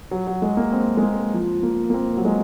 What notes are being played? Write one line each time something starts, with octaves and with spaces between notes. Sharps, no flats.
F#3
F#3
G#3
A#3
C4
G#3
A#3
F3
A#3
A#3
C4
F#3
G#3